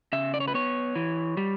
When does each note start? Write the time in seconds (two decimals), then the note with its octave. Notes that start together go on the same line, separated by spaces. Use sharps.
0.13 C#3 E5
0.34 D5
0.40 C#5
0.48 B4
0.54 B3 C#5
0.95 E3
1.37 G3